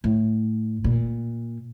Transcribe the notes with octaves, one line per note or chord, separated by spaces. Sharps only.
A2
A#2